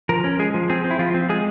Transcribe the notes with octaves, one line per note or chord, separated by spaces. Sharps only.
F3 A#4
C#4
G#3 G#4
F3
C4 G#4
C4
E4
F3 F4
C4
G#3 G#4